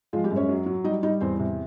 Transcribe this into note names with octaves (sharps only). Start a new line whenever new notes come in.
F3 G#3 F4
G3 G4
F#2
C#4 C#5
F#3
F#3
G3 D#4 D#5
G3 D#4 D#5
E2 C4 C5
C3